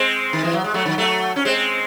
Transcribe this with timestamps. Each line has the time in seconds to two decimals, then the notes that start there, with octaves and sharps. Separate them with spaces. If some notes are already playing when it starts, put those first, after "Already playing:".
Already playing: G#3 C4
0.33 D#3
0.44 E3
0.53 F#3
0.64 G#3
0.74 F#3 A3
0.85 D#3 F#3
0.98 F#3 A3
1.36 C#4
1.45 G#3 C4